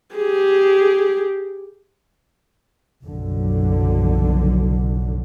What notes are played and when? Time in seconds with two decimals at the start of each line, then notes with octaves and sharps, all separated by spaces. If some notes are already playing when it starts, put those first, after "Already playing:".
0.16 G4 G#4
3.03 F#1 B1 F2 D3 F#3